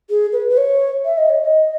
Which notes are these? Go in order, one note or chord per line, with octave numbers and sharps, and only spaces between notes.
G#4
B4
B4
C#5
E5
D#5
C#5
D#5